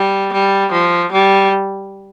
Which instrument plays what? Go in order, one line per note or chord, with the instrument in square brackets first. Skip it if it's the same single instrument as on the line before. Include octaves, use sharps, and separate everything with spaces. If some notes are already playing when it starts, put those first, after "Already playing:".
Already playing: [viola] G3
G3
F3
G3